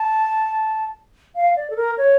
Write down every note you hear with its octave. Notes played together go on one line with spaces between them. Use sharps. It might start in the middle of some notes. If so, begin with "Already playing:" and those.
Already playing: A5
F5
D5
A4
A#4
C#5